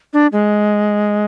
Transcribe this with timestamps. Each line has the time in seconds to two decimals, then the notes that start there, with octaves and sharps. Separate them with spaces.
0.13 D4
0.32 G#3